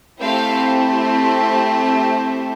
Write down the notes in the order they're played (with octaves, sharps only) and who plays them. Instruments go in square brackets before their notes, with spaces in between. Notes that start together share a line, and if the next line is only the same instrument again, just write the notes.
[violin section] A3 C4 E4 G4 F5 G5